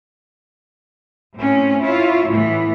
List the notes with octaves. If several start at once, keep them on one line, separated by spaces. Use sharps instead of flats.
A2 C4 C#4
E4 F4 C#5
A2 E3 B3